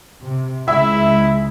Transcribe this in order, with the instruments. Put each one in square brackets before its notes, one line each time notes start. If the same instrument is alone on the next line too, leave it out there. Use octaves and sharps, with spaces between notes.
[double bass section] C3
[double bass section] C#2 C#3 G#3 [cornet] E4 [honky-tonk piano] E5